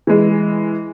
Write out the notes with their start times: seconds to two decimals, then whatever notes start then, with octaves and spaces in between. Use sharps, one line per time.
0.07 E3 G#3